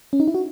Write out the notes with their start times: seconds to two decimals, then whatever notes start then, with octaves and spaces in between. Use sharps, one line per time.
0.13 C#4
0.20 D#4
0.28 E4
0.34 F#4